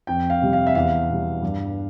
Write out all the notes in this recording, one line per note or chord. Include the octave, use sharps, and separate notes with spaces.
F2 G5
F5
C3 G3
F5
E5
E2 F5
B2 G3
G2